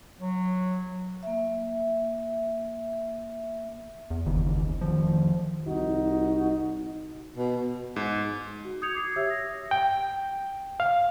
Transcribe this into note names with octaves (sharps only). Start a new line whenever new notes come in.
F#3
A#3 E5
E2
F#1 C#2 D#3 E3
F1 D#3 F3
C2 D#4 F#4
B2
G#2
F#4
D#6 G6 G#6 C#7 F7
D6 G#6 C7
G4 C#5 E5 D#6 E6 G#6
A#6
G5
F5